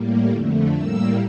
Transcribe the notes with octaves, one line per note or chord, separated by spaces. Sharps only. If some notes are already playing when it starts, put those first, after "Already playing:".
Already playing: A2 G3 A#3
F2 D3 A3
A2 G3 A#3 E6